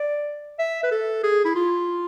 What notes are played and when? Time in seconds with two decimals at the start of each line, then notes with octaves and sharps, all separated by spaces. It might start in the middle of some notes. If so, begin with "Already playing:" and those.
Already playing: D5
0.59 E5
0.83 B4
0.91 A4
1.23 G#4
1.45 E4
1.55 F4